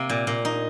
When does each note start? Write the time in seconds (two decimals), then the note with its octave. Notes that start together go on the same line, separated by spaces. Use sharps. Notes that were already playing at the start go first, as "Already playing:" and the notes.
Already playing: C3 A#3
0.09 A#2
0.27 A#2
0.45 D#4